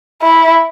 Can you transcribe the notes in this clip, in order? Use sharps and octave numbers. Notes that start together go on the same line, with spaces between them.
E4